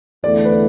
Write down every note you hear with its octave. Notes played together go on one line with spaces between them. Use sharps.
E2 D3 A3 E4 D5
B4